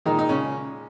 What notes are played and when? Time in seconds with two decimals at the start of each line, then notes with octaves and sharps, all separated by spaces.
0.06 A#2 D#3 G#3 D#4
0.19 D#4
0.29 C#3 C#4